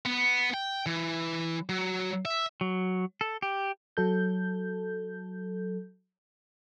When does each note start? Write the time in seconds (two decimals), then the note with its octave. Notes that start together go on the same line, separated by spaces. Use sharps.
0.06 B3
0.54 G5
0.86 E3
1.69 F#3
2.25 E5
2.61 F#3
3.21 A4
3.42 G4
3.97 F#3 A4 G6